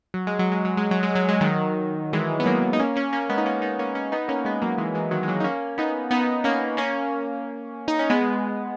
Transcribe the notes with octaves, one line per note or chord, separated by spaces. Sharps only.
F#3
G#3
F#3
G#3
F#3
G#3
F#3
G#3
F#3
G#3
D#3 F#3
E3 G#3
B3
F#3 A#3
D#4
A#3 C#4
A#3 C#4
A#3 C#4
G#3 B3
D#4
A#3 C#4
B3 D#4
A#3 C#4
A#3 C#4
B3 D#4
A#3 C#4
G#3 B3
F#3 A#3
E3 G#3
E3 G#3
D#3 F#3
G#3
F#3 A#3
D#4
A#3 C#4
B3 D#4
B3 D#4
A#3 C#4
A#3 C#4
D#4
C#4
G#3 B3